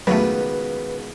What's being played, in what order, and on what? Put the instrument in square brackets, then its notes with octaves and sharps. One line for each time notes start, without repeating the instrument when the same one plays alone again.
[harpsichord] C#2 B2 D#3 [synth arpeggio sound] F#3 A3 [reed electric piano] B4